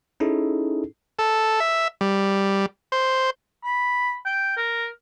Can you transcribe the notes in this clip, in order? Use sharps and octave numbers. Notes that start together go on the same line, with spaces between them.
C#4 D#4 E4 G#4 A4
A4
E5
G3
C5
B5
G5
A#4